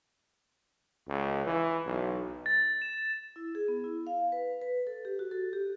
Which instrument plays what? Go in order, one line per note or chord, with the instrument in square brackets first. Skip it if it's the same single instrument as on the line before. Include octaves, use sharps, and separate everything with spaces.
[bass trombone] C#2
E3
B1
[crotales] A6
E7
[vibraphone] E4
G#4
B3
E4
F5
B4
B4
A4
G4
F#4
A4
G4